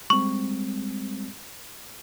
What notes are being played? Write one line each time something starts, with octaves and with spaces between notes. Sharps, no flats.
G3 G#3 C4 C#6